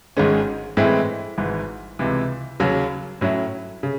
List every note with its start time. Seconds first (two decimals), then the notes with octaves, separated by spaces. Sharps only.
0.17 G#1 G#2 D#3 G#3 C#4
0.77 A2 E3 G#3 C4 E4
1.38 G#1 G#2 E3
1.99 C#2 C3 E3
2.60 D#2 C#3 F#3
3.21 A2 F#3 C#4 E4
3.83 C#3